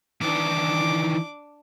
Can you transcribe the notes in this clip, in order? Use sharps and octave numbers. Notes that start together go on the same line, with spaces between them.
D#3 E3 D4 D6